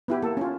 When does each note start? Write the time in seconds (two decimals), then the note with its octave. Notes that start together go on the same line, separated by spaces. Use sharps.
0.08 B3 E4 G4
0.22 A#3 A4
0.37 C#4 F4